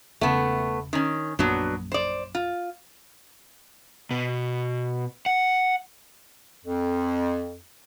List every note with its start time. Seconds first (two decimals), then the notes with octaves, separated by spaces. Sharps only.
0.21 E1 C#3 A3 B3
0.93 D#3 C#4
1.39 A#1 F#2 A#2 F#3 B3 D4
1.92 C5 D5
2.35 F4
4.11 B2
5.26 F#5
6.64 F2